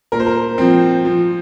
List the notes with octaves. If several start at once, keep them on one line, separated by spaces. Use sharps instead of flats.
A#2 A#4
C5
A#4
F3 C4
F3